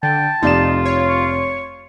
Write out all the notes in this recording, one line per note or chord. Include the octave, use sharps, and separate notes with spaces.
D3 G5 A5
F1 D#4 F4 D5 E7
C#5
C#6